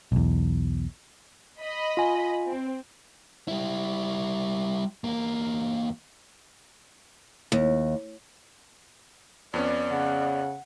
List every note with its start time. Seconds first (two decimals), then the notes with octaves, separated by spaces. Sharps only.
0.12 B1 E2
1.61 D#5 B5
1.97 F4 G#5
2.46 C4
3.48 G3 E4
5.04 E2 A#3
7.52 D#2
9.54 F2 B3 C#4 D5
9.91 C#3 F#5